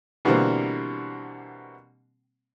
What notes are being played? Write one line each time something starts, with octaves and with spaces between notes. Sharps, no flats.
B2 D3 E3 G3 A#3 C4